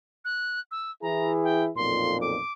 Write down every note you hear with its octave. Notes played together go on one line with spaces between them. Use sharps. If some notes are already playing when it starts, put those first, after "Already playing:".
F#6
E6
E3 E4 G#4 A#5
G5
B1 F2 A#2 C6
D6